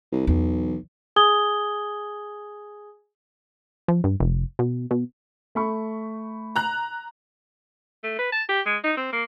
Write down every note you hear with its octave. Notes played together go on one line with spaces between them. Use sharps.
C2
B1 E2
G#4 G#5 D#6 G#6 G7
F3
G2
F1
B2
B2
A3 B5 C#6
A#5 F#6
A3
B4
A5
G4
G#3
D#4
C4
A#3